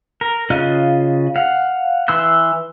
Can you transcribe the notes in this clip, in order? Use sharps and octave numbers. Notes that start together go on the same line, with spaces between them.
A#4
C#3 F4 D#5 F6 F#6
F5 F#5
E3 C6 E6 F#6